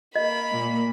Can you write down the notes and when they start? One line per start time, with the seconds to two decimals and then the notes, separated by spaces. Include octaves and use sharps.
0.15 A#3 D#5 B5
0.51 A#2